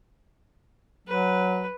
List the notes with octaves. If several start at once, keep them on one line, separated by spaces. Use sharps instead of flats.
F#3 B4